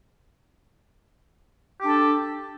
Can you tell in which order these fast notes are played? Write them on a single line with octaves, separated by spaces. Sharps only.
G4 D4 A4